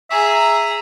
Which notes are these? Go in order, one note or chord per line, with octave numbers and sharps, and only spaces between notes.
G#4 E5 A#5